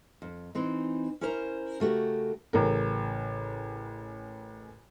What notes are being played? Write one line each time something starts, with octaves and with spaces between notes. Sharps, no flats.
F2
E3 C4 D#4
C#4 E4 A#4 C5 A#5
C#3 A3 F#4 G4 A#4
A1 C#3 A#4